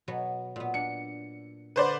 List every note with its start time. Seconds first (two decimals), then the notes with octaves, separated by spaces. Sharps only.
0.08 B2 F#3 B3
0.56 A#2 B3
0.74 D4 C#7
1.76 D3 B4 C5 D5